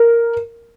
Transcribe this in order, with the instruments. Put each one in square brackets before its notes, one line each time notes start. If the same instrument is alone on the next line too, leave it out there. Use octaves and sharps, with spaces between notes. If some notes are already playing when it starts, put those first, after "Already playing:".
Already playing: [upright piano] A#4